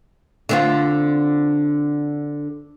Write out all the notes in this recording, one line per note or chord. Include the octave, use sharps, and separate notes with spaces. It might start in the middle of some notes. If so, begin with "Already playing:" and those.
D3 C4 F4